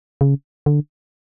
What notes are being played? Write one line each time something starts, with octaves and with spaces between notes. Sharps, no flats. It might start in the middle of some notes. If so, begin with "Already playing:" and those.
C#3
D3